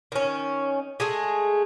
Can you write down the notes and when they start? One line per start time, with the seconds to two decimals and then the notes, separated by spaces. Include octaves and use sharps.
0.12 D#3 C#4
1.00 G#3 A3 G#4